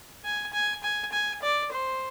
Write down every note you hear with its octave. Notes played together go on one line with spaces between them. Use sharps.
G#5
G#5
G#5
G#5
D5
C5